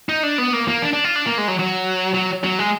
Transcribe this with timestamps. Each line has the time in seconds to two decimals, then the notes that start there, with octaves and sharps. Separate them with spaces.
0.09 D#4
0.23 D4
0.38 B3
0.53 A#3
0.68 A#3
0.82 D4
0.93 D4
1.04 F4
1.16 D4
1.26 A#3
1.38 G#3
1.48 F#3
1.59 F#3
2.14 F#3
2.44 F#3
2.59 G#3